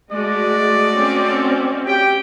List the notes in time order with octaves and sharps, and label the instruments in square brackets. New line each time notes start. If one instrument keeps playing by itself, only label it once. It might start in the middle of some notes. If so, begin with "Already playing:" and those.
[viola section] G#3 [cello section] A3 F#4 D#5 [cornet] D5
[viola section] C4 C#4
[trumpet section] G4 G5